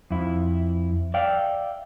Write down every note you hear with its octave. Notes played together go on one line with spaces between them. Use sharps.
F2 E4
D5 E5 F5 G5